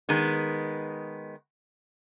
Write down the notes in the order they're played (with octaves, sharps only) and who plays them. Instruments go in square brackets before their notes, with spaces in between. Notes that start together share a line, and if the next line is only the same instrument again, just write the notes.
[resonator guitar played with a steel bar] D#3 G#3 B3